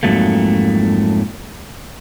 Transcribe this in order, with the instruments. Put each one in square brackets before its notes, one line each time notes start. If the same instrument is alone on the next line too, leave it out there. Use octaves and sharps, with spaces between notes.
[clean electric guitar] F2 G#2 F#3 A3 A#3